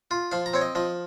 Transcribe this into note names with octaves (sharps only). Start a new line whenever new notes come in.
F4
F3 F5
A#5
C4 C#5
D#5
F3 D#5